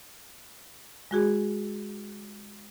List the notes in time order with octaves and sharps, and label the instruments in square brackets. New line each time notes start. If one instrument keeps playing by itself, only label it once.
[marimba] G#3 F#4 G#4